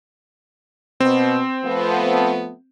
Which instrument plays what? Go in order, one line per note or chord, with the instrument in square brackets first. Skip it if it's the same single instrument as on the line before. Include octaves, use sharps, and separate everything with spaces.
[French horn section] B2 [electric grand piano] C4
[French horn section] F3 A3 B3